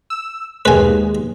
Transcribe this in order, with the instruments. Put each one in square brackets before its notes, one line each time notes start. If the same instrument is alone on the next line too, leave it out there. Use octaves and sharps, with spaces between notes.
[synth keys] E6
[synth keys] D#2 G#3 [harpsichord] B4 G#5